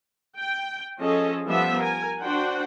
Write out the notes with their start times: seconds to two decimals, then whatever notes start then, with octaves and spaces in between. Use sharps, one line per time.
0.37 G5
0.99 F3 C#4 G#4 A4 D#5
1.46 F3 G3 B3 E5
1.77 A#4 G#5
2.21 D4 F#4 C5 F#5 G5